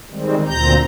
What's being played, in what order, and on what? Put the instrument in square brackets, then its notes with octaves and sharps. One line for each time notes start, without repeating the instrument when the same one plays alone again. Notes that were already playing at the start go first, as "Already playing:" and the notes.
[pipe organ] D#3 G3 G#3 C4
D2 A#2 C4 A#5 G6